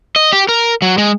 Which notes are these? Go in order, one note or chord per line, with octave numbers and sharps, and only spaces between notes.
D#5
G4
A#4
F#3
G#3